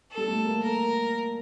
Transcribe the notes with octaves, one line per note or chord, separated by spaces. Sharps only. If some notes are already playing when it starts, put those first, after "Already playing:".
A4
G3
A3
A#3
A#4